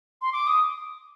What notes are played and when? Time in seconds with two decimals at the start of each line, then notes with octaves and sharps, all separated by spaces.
0.22 C6
0.33 D6
0.47 D#6